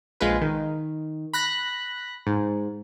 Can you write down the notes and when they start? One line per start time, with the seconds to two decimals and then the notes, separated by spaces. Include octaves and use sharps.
0.20 A#1 G#3 F4 B4
0.41 D#3
1.33 B5 F#6 A#6
2.27 G#2